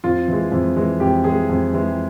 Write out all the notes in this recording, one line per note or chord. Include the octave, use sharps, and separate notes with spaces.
F2 F4
E3 G#3
F2
E3 G#3
F2 G4
E3 G#3 G#4
F2
E3 G#3